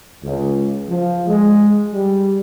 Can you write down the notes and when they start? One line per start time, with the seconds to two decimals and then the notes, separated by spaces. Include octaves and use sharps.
0.24 C#2
0.89 F3
1.28 G#3
1.93 G3